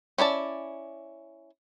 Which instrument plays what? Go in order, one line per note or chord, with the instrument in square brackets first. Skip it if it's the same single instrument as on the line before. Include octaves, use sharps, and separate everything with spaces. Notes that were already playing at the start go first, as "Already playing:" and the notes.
[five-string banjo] C#4 E4 D5 A5